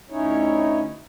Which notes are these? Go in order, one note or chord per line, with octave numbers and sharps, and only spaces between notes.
D2 C#4 D#4 E4 C#5